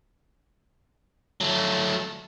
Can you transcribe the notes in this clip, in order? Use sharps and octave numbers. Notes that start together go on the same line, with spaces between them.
F#3 A3